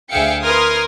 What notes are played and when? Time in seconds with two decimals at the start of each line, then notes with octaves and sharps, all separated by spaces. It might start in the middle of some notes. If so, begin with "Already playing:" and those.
0.10 D2 G#4 E5 F5 G5 C#7
0.44 A#4 B4 C6 D#6 F6 G#6